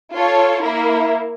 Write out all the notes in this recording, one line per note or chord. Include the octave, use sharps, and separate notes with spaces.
F4 A4 C#5
A#3 E4 A#4